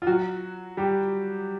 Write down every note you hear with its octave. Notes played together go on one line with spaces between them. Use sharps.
F4
F#3 F#4
G3 G4